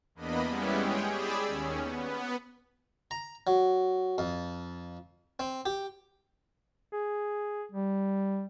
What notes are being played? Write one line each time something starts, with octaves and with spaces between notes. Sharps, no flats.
E2 A#3 B3 D4 D#5 B5
G3 G#3 B3 C#4 E4 G4
G#3 G#4 C#5 G5
G4 G#4 D5 B5 E6
D#2 C#4
B3
A#5
F#3
F2
C4
G4
G#4
G3